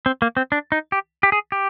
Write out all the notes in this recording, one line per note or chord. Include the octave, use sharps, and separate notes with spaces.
C4
A#3
C4
D4
D#4
G4
G4
G#4
G4